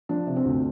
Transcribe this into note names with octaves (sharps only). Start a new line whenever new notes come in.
F3 D4
C3
C4
D2